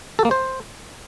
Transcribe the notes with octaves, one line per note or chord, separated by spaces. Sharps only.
A4
A#3
C5